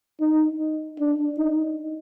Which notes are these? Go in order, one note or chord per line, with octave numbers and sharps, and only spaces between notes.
D#4
D4
D#4